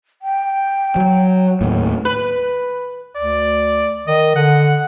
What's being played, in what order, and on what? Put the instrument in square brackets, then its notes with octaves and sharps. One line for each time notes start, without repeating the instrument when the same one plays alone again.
[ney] G5
[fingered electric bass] F#3
D#2 A2
[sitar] B4
[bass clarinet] D2 [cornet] D5
[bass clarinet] D#3 [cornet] D#5
[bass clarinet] D3 [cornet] F#5